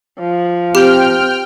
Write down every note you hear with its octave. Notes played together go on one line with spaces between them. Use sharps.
F3
C4 G4 G5 F6